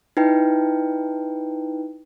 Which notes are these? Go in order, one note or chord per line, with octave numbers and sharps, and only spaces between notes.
D#4 E4 B4 G5